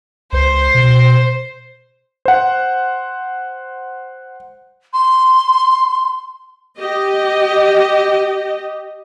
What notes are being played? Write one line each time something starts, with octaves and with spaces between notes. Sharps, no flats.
C#2 C5
B2
C5 F#5
C6
G4 D#5